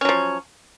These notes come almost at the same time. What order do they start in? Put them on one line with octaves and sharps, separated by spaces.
C#4 F#3 F3